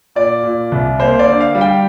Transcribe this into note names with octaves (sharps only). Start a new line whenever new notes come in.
A#2 D5
A#2
C2
A#3 C5
D5
D3
F5
G3
G5